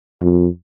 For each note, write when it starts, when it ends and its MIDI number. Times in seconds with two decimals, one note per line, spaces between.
0.22 0.47 41